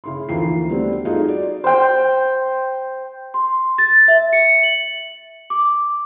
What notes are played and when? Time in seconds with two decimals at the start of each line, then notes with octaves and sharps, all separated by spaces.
0.04 C#3 E4 C6
0.29 D2 E3 F3 A#3 D#4 C7
0.69 G3 A3 B3 C4 D4 F#4
1.05 D#4 F4 F#4 G#4 A4 D#5
1.29 D5
1.64 C5 G5
3.34 C6
3.78 A6
4.08 E5
4.33 C#7
4.63 F#7
5.50 D6